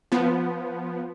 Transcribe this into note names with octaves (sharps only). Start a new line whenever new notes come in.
F3 B3